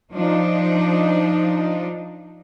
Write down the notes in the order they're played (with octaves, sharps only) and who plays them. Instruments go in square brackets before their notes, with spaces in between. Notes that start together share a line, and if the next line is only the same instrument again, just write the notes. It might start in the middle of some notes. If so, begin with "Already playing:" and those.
[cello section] F3 D4 D#4